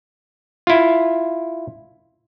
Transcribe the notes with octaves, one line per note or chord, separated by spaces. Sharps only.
E4 F4